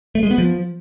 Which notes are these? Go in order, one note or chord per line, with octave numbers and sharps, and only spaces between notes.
A3
G#3
B3
F3